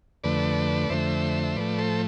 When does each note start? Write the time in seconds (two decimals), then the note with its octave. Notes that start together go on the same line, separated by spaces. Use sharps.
0.24 F2 D3 A3 B4 D5
0.90 F2 D3 A3 C5 E5
1.43 E5
1.56 A2 F3 A3 B4 D5
1.79 A4 C5